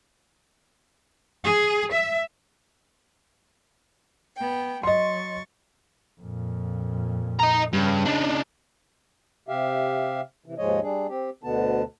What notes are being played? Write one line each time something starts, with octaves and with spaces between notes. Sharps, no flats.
G#4
E5
B3 G5
F#3 D#5 C6 C#6 A6
F2 A#2
D#5 A#5
G2 C#3
D4 D#4
C3 G4 E5 F5
C3 E3
D#2 G#2 F3 G#3 C#5 D#5
G3 D4 G#4
C4 G4
D2 B2 D3 B3 A5